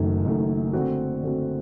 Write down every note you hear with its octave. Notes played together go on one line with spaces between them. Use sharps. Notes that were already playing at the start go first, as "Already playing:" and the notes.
Already playing: F#1 F#2 D#3 A3
F#1 F#2 D#3 A3
D3 A3 C4 F#4
D3 A3 C4 F#4